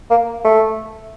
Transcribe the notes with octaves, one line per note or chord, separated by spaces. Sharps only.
A#3
A3